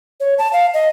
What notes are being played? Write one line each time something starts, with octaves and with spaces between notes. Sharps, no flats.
C#5
A5
F5
D#5